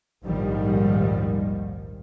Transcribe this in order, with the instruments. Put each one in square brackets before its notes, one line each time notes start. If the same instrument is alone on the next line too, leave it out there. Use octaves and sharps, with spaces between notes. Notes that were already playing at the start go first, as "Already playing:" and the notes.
[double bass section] A#1 D#2 G#2 D#3 F3 G3